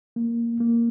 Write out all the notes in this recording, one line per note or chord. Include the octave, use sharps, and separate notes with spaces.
A#3
A#3